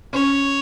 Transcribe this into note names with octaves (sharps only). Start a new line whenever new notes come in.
C#4 C#5